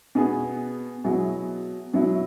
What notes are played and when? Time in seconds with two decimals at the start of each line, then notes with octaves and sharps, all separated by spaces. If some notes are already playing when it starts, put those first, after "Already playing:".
0.15 B2 B3 G#4
1.04 B2 F#3 E4 G#4
1.94 B2 F#3 E4